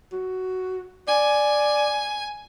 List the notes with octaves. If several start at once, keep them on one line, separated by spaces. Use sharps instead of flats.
F#4
D5 G#5